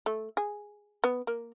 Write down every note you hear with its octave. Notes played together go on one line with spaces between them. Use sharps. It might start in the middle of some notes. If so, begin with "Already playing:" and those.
A3
G#4
B3
A#3